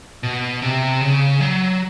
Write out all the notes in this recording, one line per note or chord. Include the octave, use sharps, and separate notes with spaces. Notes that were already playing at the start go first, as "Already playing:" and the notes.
B2
C3
C#3
F#3